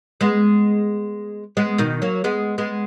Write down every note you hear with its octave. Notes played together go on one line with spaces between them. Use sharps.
G#3 B3
G#3 B3
B2 D#3
F#3 A#3
G#3 B3
G#3 B3